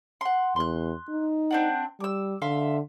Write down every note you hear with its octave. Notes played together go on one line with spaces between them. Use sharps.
F#5 C6
E2 C6 F#6
D#4
C4 D4 F#5
G3 D6 E6
D3 E5 F5 C6